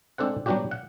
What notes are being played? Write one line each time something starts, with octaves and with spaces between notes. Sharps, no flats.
G#3 C4 D4 A4 C5 F#5
F#3 G3 B3 D4 F#4 G4
F#5